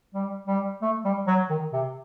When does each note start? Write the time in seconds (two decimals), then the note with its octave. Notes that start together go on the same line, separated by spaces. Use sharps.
0.14 G3
0.48 G3
0.82 A3
1.05 G3
1.27 F#3
1.50 D#3
1.73 C3